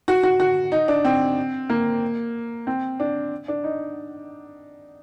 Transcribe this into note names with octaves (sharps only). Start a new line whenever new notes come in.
F#4
F#4
F#4
D#4
D4
C4
A#3
C4
D4
D4
D#4